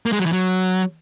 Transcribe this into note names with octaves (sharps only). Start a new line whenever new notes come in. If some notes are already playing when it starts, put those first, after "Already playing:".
A#3
G#3
F#3
E3
F#3